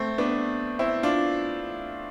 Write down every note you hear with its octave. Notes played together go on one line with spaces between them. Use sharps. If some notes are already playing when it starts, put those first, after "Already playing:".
Already playing: A3 C4
B3 D4
C4 E4
D4 F4